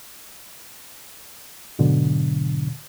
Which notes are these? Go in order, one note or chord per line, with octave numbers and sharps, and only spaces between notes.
G#2 B2 D3 F#3